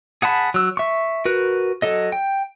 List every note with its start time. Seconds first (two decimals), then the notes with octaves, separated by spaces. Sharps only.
0.22 G#4 F#5 A5 B5
0.54 F#3 E6
0.77 E5 C#6
1.25 F#4 A#4 B4
1.82 F#3 A4 D#5
2.12 G5